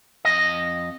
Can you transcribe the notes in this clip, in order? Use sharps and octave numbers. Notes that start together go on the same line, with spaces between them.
F2 D#5